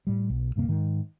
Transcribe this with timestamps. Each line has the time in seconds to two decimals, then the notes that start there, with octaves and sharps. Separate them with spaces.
0.07 A2 G3
0.30 B1
0.56 D1 G2 C3 A#3
0.68 G#2 D#3